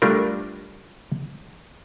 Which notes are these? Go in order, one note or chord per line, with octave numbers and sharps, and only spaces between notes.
G3 A3 D4 F4 A#4